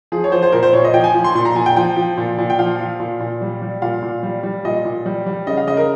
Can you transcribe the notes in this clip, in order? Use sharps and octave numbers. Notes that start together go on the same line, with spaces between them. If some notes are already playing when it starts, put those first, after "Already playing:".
F3 G#4
C#5
F3 C5
C5
A#2 A#4
C5
A#2 C#5
D#5
F3 G5
G#5
F3
C6
A#2 C6
A#5
A#2 G#5
G5
F3 G5
F3
A#2
A#2
G5
F3 F5
F3
A#2
A#2
G3
G3
A#2 F5
A#2
G3
G3
A#2 D#5
A#2
G3
G3
C#3 D#5
F5
C#3 D#5
A#4